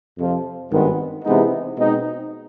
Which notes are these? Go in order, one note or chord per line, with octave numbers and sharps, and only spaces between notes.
F2 C3 F3
G#1 G2 D#3 G#3 B3
C3 E3 G#3 B3 D#4
B2 G#3 C4 D#4